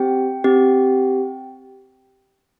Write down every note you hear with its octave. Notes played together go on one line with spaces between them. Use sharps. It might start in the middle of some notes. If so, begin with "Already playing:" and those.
Already playing: C4 G4 G5
C4 G4